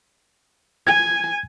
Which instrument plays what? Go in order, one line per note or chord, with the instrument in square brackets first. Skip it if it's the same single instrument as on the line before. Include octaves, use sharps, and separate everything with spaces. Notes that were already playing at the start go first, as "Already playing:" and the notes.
[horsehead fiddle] G#5 [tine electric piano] G#6